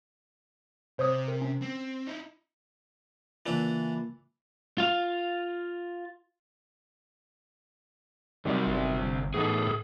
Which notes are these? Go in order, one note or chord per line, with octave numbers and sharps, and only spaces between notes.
C3 C5 C#5 D#6
A#4
C#4
C4
D#4 E4
C#3 E3 A#3 D4 E4 F4
F4 F5
C3 D#3 F#3 G3 C4 D5
G1
A2 E3 B3 D#4 G#4 A4